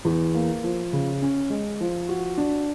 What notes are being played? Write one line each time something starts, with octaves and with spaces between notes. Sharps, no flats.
E2
A#3
F3
C#3
C#4
G#3
F3
F#4
D4